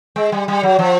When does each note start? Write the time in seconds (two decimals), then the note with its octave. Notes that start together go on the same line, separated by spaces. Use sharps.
0.16 G#3
0.32 G3
0.48 G3
0.63 F#3
0.79 F3